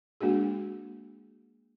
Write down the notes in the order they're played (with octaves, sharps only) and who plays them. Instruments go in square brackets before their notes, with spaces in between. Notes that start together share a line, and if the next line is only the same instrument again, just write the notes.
[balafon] G#3 A#3 D4 F#4 G#4